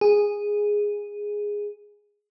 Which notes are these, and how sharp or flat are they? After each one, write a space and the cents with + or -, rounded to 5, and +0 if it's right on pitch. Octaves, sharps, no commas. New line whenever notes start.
G#4 -5